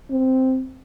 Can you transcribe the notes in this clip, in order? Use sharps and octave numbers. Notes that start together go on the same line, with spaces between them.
C4